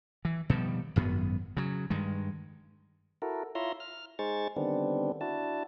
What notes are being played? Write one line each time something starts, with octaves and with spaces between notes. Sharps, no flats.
E3
B2 D#3 F3 G3
G#1 F#2 B3
C#3 F#3
G2 D#3 G#3
E4 F#4 A4 A#4
E4 F4 C#5 E5 A#5 C6
F6
G#3 D#4 G#4 C5 C#6 A6
D3 D#3 G3 B3 C4 D4
D4 E4 F#4 A5